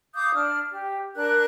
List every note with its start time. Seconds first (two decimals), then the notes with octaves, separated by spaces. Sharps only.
0.14 F5 D6 D#6 G6
0.34 D4 F6
0.70 G4
1.16 D4 A#4 F#6